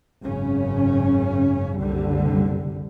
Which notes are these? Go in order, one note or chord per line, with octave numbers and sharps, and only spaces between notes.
G#1 F#2 C#3 C#4
F#1 C2 D3 G3